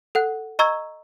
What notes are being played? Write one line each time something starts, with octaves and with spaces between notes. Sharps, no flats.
A4 F#5 F#6
D#5 A#5 C#6 E6 G#6